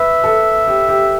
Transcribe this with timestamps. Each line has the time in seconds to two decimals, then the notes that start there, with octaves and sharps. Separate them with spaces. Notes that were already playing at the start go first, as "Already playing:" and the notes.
Already playing: B4 E5
0.24 A4
0.68 G4
0.89 G4